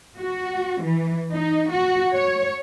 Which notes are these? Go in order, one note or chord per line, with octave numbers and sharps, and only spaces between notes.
F#4
E3
D#4
F#4
C#5